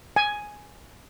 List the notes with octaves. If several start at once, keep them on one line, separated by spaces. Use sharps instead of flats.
G#5